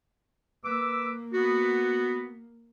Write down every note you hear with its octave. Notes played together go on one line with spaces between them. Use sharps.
A#3 B4 D6 E6
B3 F#4